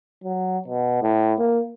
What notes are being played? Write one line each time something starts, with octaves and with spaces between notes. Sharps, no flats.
F#3
B2
A2
A#3